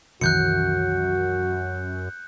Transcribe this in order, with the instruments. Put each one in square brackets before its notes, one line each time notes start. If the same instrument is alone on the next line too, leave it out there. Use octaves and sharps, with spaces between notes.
[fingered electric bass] C2 D#3 E3 [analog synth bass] F#2 [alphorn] F#4 [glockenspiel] F#6 G6 C#7